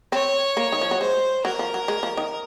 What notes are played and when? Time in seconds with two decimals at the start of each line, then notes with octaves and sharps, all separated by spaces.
0.12 C4 C#5
0.57 A#3
0.72 D#3
0.81 F3
0.91 F#3
1.00 G#3 C5
1.45 F#3 A#4
1.59 F3
1.74 F#3
1.88 G#3
2.03 F3
2.17 D#3